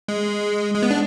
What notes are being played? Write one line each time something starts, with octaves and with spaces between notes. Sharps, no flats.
G#3
G#3
B3
D4